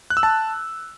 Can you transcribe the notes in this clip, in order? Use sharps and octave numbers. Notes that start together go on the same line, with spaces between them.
F#6
E6
A5